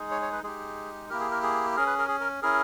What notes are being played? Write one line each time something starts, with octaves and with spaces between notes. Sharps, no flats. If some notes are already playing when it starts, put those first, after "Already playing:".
Already playing: G#3 D#4 G#4
C#5
C#5
B4
G#3 D#4 G4 G#4
A#3 E4 G4 A#4
G#4
A#4
G#4
C#4 G#4 A#4
B4
A#4
G#4
A#4
C#4 E4 G#4 A#4